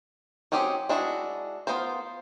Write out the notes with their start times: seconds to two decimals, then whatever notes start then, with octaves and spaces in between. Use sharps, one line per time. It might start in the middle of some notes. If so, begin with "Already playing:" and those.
0.52 F#3 C4 C#4 G4 G#4
0.89 G#3 D4 E4 F#4
1.67 B3 F4 A#4 C5